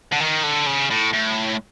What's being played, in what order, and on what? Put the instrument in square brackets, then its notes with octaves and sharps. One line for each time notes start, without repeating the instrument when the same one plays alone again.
[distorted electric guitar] D3
D#3
D3
C#3
A2
A2